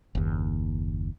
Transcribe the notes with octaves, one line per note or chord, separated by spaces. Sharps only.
F#1 D#2